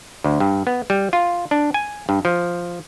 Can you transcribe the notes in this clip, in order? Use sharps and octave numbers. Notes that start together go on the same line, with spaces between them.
D2
G2
B3
G3
F4
D4
G#5
G2
F3